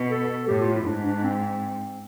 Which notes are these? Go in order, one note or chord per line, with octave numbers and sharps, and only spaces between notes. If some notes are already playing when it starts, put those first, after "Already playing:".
Already playing: B2
A4
A2 G4
F4
E4
G#2 D4
D4
C4